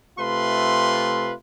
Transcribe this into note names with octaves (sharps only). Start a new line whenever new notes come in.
C3 A3 F4 B4 C6